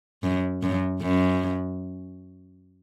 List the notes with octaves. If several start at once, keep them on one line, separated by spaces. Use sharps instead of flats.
F#2
F#2
F#2